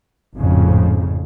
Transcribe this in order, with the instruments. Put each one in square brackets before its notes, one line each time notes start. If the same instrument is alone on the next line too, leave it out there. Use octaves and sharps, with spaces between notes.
[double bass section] G#1 F2 A2 C#3 F3